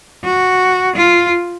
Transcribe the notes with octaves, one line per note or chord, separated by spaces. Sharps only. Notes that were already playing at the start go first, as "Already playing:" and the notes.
F#4
F4